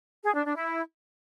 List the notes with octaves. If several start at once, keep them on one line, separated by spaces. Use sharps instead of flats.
G#4
D4
D4
E4